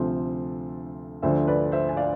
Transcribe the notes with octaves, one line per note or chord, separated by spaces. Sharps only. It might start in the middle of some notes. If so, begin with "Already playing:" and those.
Already playing: D2 C3 F3 A4 C5
D2 D3 F3 C5 E5
B4 D5
C5 E5
G#5
D5 F5